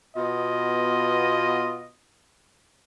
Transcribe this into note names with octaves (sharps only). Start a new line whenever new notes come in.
B2 B3 F4 D#5